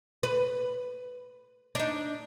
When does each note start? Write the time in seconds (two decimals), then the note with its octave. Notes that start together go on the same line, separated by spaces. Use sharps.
0.23 B4
1.75 D4 D#4